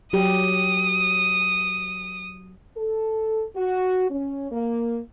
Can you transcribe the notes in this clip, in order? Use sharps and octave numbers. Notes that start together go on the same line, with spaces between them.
F#3 G4 D#6
A4
F#4
C#4
A#3